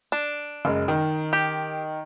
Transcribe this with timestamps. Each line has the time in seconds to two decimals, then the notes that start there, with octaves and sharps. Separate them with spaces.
0.12 D4
0.65 F#1 G#3
0.88 D#3
1.33 G4